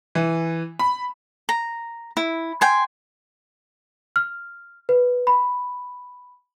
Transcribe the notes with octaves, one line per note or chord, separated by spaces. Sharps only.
E3
B5
A#5
E4
G5 G#5 C6
F6
B4
B5